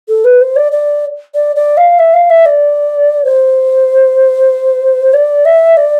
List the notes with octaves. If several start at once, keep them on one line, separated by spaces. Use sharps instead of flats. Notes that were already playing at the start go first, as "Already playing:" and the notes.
A4
B4
C5
D5
D5
D5
D5
F5
E5
F5
E5
D5
C5
D5
E5
D5